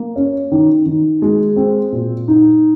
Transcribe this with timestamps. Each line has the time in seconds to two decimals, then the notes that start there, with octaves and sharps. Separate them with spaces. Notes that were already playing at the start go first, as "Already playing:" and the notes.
Already playing: A#3
0.16 C#4
0.52 D#3
0.86 D#3
1.22 G#3
1.56 C4
1.92 A#2
2.28 D#4